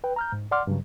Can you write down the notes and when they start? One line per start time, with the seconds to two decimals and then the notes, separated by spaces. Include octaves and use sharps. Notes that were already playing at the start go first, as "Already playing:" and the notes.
0.04 B4 G5
0.16 A#5 F6 G6
0.32 G#2
0.51 D5 F#5 C6 D6 F6
0.67 G2 C#3 F#3